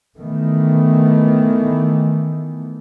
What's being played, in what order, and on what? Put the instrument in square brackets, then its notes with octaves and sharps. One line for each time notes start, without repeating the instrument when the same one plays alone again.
[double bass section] D#3 E3 A3 B3